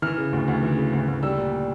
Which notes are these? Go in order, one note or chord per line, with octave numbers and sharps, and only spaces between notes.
E3 F6
C#3
D2
D2
E3
C#3
D2
D2
G3 E6
A#2